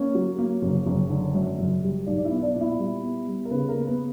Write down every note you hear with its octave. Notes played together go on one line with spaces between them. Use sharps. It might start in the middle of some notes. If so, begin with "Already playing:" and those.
Already playing: A#3 C#4 C#5
F#3
A#3
F#1
F#1
D3
F#2
F#1
G3
B1 D4 D5
D5
E4 E5
B3
D4 D5
A#2
E4 E5
G3
B3
G3
A#4
C#3 B3 B4
A#4
A#3
B3 B4